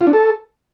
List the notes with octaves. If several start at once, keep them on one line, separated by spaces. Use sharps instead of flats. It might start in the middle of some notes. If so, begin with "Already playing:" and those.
F4
D4
A4